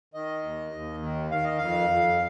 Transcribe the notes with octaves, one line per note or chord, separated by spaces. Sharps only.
D#3 D#5
D#2
D#2
D#3
D#3 F5
D#5
F2 F5
F2